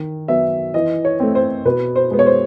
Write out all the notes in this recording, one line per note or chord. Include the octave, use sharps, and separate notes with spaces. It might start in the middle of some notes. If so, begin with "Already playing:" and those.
Already playing: D#3
F#3 B3 E5
E3 D#5
C#5
A3 C4
C5
B2 B4
C5
G#3 B3
C#5
C5